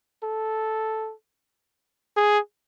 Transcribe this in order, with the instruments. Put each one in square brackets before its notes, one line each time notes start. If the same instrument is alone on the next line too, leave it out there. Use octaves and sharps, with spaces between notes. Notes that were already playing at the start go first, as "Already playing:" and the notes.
[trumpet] A4
G#4